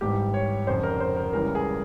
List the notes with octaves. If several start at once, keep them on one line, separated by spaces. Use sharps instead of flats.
G#1 G#2 E3 G3 G4
C#5
F1 F2 C#3 C5
A#4
C5
A#4
C#2 C#3 E3 G3 A#4
G#4